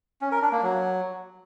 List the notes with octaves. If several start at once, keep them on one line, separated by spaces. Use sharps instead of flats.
C#4
A#4
D4
A#3
F#3